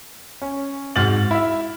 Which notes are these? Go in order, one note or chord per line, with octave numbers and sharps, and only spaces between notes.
C#4
G#2 C4 F#4 F6 A6 F#7
E4 E5